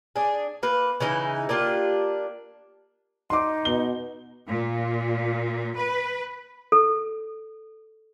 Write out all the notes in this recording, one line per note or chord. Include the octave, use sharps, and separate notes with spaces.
D4 G#4
A#3 B4
C#3 E3 D#4 E4
A#3 D4 F4 G4
D#4 C6 D6
B2 G7
A#2
B4
A4